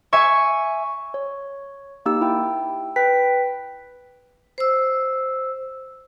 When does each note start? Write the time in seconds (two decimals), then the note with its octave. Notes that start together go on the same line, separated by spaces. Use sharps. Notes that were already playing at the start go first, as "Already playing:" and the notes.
0.13 E5 G#5 C#6
1.14 C#5
2.06 A#3 D#4 G4 E6
2.21 E4 G5
2.96 B4 G5 B6
4.58 C5 E6